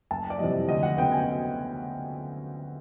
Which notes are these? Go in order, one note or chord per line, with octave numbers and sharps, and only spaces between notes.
F#1 A5
D5
F2 C3 E3 G3 D#5
D2 D#5
F#5
C#3 F#3 B3 G5
G#5